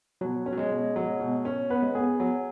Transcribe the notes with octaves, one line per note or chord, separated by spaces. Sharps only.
B2 F#3
C#4
F#3
G#3
B2
F#3
B2
C#4
B3 B4
G#3
B3 G#4
F#3